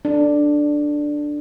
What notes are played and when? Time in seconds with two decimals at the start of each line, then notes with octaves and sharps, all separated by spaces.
0.05 D4